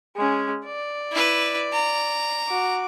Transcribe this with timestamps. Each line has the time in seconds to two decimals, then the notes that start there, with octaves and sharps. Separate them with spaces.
0.16 G#3 C#4
0.66 D5
1.12 E4 B4
1.73 A#5
2.48 F#4 D6